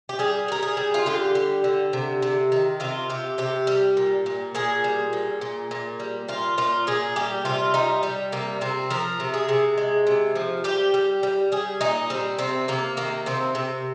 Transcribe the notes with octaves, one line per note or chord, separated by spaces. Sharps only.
G4
G3 G#4
G3 A#4
G#4
G3
F4
D3 G4
G3
D3
C3
C3
D#3
C3 F4
C3 G4
C3 G4
G3
A#2
A#2
A#2 G#4
G3
A#2
A#2
A#2
G3
A#2 F4
A#2 F4
A#2 G#4
G3 G4
C3 F4
G3 D#4
G3
C3 A#3
C3 C4
F3 A#4
C3
G#4
C3
G#3
C3
F3
G3 G4
G3
G3
G3 G#4
A#2 D#4
G3 C4
C3 C4
C3 A#3
D#3 A#3
C3 C4
C3